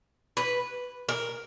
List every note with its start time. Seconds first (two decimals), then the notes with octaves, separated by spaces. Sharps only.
0.37 B4
1.09 A#4